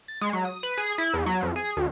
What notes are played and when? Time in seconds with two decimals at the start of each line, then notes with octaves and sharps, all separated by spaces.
0.08 A6
0.21 G#3
0.33 F#3
0.45 D#6
0.63 B4
0.78 G#4
0.98 E4
1.14 E2
1.26 F#3
1.43 F2
1.56 G#4
1.77 D2